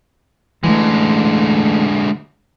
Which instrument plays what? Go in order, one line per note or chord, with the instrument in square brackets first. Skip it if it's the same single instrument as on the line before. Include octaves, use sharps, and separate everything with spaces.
[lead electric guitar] D3 G#3 [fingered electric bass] E3 A3